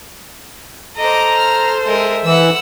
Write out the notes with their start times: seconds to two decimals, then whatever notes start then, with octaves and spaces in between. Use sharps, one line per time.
0.97 A4 C5 D#5 A#5 D6
1.37 F6
1.86 G#3 A#4 E5
2.25 E3 F#5 E6